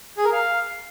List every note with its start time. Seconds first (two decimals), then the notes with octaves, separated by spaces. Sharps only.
0.17 G#4
0.25 A#4
0.33 F5